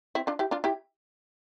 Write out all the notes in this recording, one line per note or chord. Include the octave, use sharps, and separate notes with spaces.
C4 E4
D4 F4
E4 G4
D4 F4
E4 G4